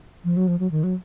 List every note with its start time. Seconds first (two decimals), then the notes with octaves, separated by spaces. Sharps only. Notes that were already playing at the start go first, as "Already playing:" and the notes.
0.24 F3
0.37 F#3
0.48 F3
0.59 F#3
0.71 D#3
0.84 F#3